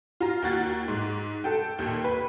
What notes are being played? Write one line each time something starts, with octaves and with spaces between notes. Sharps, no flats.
F4 A#5
D#2 F#4 A6
G#2
A4 G5
D#2 A#2
B4